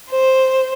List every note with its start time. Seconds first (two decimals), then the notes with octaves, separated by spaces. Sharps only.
0.10 C5